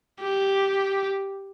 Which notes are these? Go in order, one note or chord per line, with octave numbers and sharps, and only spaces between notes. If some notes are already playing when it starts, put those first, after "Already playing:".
G4